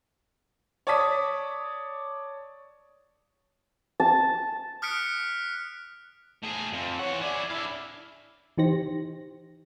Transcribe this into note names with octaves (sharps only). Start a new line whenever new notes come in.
C#5 D5 A5 D6 D#6 B6
A5
D#6 F6 F#6 B6 C#7 D7
A2 G#4
F2 C4
E3 C#5 F#5
E4 G#4 D5
D4 E4 F5
E3 D#4 G4 C5 A#6